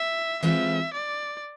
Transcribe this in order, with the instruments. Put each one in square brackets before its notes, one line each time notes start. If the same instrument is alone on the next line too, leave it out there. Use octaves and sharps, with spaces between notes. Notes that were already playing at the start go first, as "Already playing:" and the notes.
Already playing: [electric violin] E5
[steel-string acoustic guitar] E3 G#3 C4 F4 A4 [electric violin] E5
[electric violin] D5